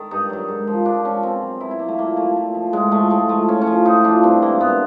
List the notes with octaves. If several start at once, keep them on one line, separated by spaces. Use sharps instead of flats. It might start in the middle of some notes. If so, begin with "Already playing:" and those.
Already playing: D#3 A4
G2 D#4
D#3 F#3
G#2
F3
G#2 D4
F3 C#4
B2 C4
F#3
B2 E4
E4
F#3 A#3
A3
A#2 A#3
F3 A3
A#2
F3
A2 G#3
F3 A3
A2 G#3
F3 A3
A2 C#4
C#4
F3
A2 D#4
F3 D4
G2 C4
E3 A#3
G2 B3